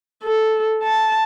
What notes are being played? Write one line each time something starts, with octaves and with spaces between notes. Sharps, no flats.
A4
A5